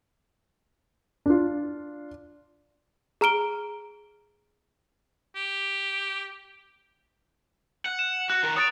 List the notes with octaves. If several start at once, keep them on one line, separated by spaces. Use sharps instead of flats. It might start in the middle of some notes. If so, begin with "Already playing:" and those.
D4 F4
G#4 A#5 F6 D7 G7
G4
F#5
E7
F#4 F#6
D#3 A#4
C#5 D#6 A6 D7